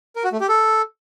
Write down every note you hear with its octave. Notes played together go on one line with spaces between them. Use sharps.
A#4
F#4
A3
G4
A4